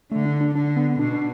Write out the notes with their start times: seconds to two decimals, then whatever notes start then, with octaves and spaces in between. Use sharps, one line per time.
0.11 D3 A3
0.25 D4
0.41 D4
0.55 D3 D4
0.76 B3
0.99 B2 D4
1.13 D4